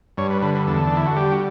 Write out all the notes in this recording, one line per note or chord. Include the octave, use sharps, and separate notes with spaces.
G2 C#5
B4
D3 B4
B4
E2 A4
D4
D3 E4
F#4
G3 G4
F#4